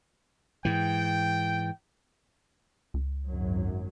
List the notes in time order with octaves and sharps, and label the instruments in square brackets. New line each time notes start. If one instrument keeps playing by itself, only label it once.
[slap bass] G#2 E3 [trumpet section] G5
[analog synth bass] C#2
[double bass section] G#1 F#2 F#3